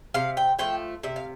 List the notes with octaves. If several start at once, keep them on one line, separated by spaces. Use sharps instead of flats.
C3 F5
G5
F3 A3 G5
C3 E5
F5